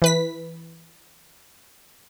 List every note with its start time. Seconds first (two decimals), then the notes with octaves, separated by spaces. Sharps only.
0.02 E3 B4 B6